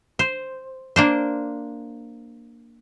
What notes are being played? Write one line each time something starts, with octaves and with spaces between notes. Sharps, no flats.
C5
A#3 D4 C5